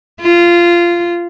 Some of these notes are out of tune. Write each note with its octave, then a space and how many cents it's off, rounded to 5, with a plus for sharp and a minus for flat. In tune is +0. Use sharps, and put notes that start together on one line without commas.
F4 -15